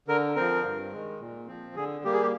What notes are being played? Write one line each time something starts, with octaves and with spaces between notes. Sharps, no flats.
D3 A#4
F3 C4 A#4
G2
D#3 G#3
A#2
F3 C4
D3 G#4
G3 A#3 G4
G#4
G4